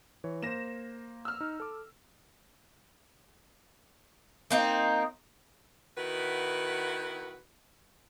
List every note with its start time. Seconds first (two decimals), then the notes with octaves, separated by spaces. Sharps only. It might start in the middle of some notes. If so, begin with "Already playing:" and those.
0.24 E3 C#5
0.43 A#3 C5 A#6 E7
1.25 E6 F6
1.41 D#4
1.60 A4 D6
4.51 A#3 C4 D#4
5.97 D#3 B3 E4 F#4 B4